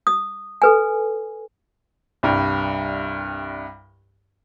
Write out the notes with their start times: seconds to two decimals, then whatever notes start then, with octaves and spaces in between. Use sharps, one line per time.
0.07 D#6
0.62 A4 B4 G#5
2.23 C2 G2